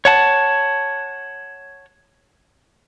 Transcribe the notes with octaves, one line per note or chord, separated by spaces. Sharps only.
C#5 F#5 A5